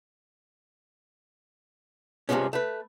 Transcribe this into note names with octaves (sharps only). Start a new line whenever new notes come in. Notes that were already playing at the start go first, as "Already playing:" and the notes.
G2 C3 E3 F3 G#3 C#4
A3 B4